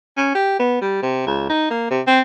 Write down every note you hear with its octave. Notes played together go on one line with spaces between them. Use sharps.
C#4
G4
B3
G3
C3
C#2
D#4
A#3
C3
C4